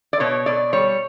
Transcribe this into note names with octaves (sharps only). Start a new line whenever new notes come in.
D5
B2 C#5
B2 D5
G3 C#5